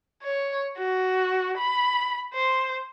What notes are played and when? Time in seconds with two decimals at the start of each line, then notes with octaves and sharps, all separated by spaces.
0.23 C#5
0.78 F#4
1.58 B5
2.34 C5